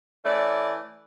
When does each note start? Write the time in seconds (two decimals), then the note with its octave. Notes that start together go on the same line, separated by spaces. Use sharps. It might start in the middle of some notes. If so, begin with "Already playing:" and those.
0.25 E3 A3 C#4 D5